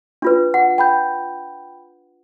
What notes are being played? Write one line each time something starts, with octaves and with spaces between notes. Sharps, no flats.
D4 F4 B4
F#5
G5 B5 G6